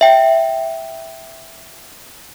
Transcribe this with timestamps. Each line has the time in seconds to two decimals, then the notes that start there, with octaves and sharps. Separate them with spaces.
0.01 E5 G5